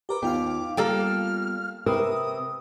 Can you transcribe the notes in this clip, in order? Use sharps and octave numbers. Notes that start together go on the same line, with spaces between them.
G4 A#4 B4 D6
D#2 B3 F4 F5 G5
G3 A#3 A4 G5 F6
C3 A#4 B4 D#6 E6